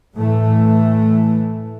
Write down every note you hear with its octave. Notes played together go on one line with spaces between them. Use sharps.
A2 E3 A3